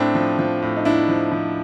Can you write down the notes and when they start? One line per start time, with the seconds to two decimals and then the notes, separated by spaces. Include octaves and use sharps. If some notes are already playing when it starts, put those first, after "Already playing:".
Already playing: A2 C4 D4
0.15 F3
0.39 F3
0.62 A2
0.76 D#4
0.85 A2 D4 E4
1.09 F3
1.32 F3